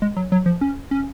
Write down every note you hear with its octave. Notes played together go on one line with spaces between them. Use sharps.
G#3
F#3
F#3
F3
C#4
C#4